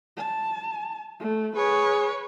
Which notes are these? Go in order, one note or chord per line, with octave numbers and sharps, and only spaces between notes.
A5
A3
G#4 B4 C#5